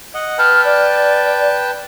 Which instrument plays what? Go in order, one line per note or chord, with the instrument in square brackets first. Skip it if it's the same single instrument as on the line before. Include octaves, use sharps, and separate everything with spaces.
[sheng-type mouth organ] D#5 F#5
[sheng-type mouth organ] B4 G5 A5 [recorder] F6
[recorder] D5